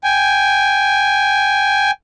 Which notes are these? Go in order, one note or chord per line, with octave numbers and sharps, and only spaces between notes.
G5 G#5